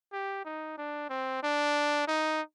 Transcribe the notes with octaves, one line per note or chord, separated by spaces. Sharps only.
G4
D#4
D4
C4
D4
D#4